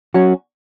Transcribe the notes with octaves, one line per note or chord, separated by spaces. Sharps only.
F#3 C#4 F#4